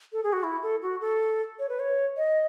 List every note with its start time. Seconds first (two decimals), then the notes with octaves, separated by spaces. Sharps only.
0.13 A4
0.23 G#4
0.33 F#4
0.43 E4
0.63 A4
0.82 F#4
1.01 A4
1.59 C#5
1.69 B4
1.80 C#5
2.17 D#5